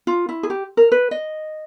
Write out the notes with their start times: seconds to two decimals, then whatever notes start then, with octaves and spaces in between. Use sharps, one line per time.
0.07 F4
0.29 E4
0.43 G#4
0.50 G4
0.77 A#4
0.92 B4
1.11 D#5